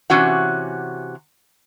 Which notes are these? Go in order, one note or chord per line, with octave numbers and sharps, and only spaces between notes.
C3 E3 C#4 F#4 F#5